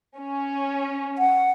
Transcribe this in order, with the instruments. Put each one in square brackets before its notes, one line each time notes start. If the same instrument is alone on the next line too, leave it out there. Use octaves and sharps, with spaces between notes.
[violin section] C#4
[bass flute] F#5